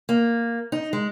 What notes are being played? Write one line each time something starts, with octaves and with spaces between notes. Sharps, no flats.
A#3
D#4
G#3